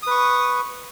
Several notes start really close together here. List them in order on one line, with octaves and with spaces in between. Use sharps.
D#6 B4 C#6